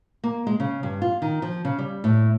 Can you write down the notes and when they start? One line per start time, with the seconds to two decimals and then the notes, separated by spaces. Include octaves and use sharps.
0.24 A#3
0.47 G#3
0.60 C#3
0.83 G2
1.02 F4
1.22 D#3
1.42 F3
1.65 C#3
1.79 G3
2.04 A2